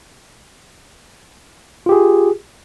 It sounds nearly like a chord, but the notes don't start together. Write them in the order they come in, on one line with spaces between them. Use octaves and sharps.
F4 G4 G#4